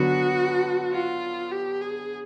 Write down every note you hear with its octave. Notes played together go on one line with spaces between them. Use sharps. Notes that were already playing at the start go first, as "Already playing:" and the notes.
Already playing: D3 F#3 B3 F#4
F4
G4
G#4